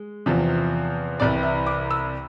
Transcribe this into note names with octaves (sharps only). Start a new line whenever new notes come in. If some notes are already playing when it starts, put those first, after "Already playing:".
Already playing: G#3
E2 C3 F3
C2 C3 E3 D5
E5
D6
E6